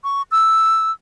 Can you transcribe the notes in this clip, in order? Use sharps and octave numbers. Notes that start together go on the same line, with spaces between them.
C#6
E6